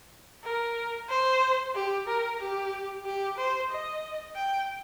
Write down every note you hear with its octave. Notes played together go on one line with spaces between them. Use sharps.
A#4
C5
G4
A#4
G4
G4
C5
D#5
G5